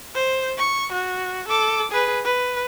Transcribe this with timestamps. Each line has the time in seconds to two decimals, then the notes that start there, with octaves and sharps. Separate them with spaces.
0.15 C5
0.57 C#6
0.92 F#4
1.48 A4 D6
1.91 G#4 B4
2.25 B4